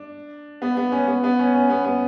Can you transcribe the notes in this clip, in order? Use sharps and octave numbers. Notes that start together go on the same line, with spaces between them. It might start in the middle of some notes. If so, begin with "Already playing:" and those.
Already playing: D4
B3
B3
C#4
B3
B3
C#4
C#4
B3
B3